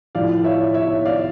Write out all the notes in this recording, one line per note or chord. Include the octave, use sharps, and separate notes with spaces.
A2 F3 D5 F5
C#5 E5
C#5 E5
D5 F5